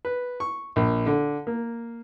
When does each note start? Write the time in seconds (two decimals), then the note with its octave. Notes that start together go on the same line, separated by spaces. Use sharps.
0.05 B4
0.40 C#6
0.76 A#1
1.06 D3
1.47 A#3